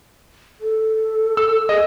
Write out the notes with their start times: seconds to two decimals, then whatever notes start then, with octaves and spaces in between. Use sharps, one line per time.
0.61 A4
1.37 E6
1.69 G#4 D#5